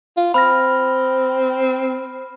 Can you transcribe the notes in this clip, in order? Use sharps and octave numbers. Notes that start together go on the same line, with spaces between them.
F4
C4 B5 F6 A#6